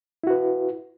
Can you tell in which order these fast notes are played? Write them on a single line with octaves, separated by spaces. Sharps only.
E4 F#4 B4